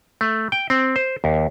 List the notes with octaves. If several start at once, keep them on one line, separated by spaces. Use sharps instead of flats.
A3
G5
C4
C5
D#2